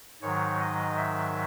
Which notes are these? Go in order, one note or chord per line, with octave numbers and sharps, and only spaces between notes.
G#2 D#3 F#3 C#5
D#5
E5